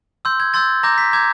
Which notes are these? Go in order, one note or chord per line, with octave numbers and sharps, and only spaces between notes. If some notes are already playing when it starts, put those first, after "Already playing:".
C6 E6 G6
G#6
C6 E6 G6 A6
A#5 D6 G6 A#6
B6
A#5 D6 G6 G#6